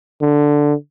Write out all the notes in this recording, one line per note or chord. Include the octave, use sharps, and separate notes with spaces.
D3